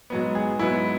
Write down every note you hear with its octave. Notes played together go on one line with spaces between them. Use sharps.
G#2 F#3 B3
G#4
G#2 F#3 B3 E4